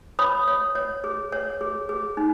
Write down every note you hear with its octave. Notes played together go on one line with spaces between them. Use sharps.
C#5 B5 D#6
C#5
C#5
G#4
C#5
G#4
G#4
D#4